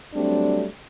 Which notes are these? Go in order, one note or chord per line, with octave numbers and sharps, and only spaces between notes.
F#3 G3 A3 C4 D4